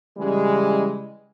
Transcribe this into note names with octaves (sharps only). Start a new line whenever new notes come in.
C#3 E3 G3 G#3